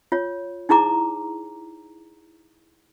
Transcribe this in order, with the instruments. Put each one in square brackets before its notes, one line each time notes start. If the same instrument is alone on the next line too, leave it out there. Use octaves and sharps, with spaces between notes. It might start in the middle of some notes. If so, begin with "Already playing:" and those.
[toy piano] F4 C#5
D#4 E4 G#4 A#5 D6